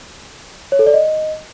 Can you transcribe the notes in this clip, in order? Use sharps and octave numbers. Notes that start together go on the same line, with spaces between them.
C#5
A4
D5
D#5